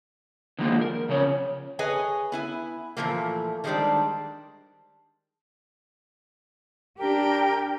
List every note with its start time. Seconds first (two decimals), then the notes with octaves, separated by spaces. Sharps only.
0.59 D3 D#3 F3 G#3 A#3
0.81 A#4
1.09 C#3 F3 C#4 C#5
1.79 G#4 B4 C#5 D#5 G#5
2.32 B3 E4 G#5
2.97 A#2 E3 F3 A3 A#3
3.64 D#3 G3 G#3 D4 C5 D5
6.99 D4 G4 A#4 G5